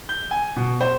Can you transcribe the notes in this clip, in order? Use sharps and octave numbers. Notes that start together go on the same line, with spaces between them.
G6
G#5
B2
C5